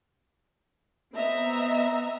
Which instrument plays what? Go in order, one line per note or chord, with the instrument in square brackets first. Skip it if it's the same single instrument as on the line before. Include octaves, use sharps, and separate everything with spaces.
[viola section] B3 C4 D#5 E5 A#5